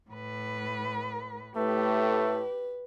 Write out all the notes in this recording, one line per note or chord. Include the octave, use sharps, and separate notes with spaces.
A2 B4
A2 A3 G4 B4